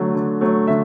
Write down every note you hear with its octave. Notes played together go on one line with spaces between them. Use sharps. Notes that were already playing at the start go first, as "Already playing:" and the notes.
Already playing: D3 F#3 A3
D3
F#3 A3
D3 E5